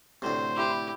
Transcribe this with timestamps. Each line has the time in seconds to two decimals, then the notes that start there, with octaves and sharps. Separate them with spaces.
0.22 D2 A2 C3 C5
0.57 E4 G4 B4